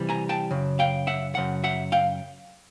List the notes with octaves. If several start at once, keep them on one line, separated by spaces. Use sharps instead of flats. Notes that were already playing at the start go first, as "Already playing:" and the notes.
Already playing: C3 E3 G3
G#5 A#5
G5 A5
F#2 C#3
F5 G5
E5 F#5
F#2 C#3 F#5
E5 F#5
F5 G5